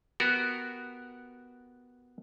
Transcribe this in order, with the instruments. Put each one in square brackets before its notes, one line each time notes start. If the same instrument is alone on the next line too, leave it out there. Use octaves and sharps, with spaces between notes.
[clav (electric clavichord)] B3 F#4 G4 A#4